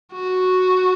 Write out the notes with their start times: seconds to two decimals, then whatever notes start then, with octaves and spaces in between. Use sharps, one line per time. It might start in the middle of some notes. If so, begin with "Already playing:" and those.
0.13 F#4